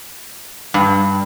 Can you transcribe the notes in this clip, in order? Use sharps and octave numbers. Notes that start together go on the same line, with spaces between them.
G2